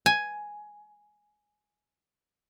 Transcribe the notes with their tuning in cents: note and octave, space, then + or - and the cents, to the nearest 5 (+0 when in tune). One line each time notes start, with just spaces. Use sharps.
G#5 +5